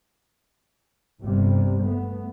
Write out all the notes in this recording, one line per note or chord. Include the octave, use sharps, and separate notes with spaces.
G1 G2 C3 G3
A3 B3